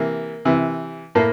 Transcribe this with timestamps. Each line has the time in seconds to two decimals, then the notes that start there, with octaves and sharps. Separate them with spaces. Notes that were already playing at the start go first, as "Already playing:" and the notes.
Already playing: C3 E3 A#3
0.45 C3 E3
1.15 A2 A#3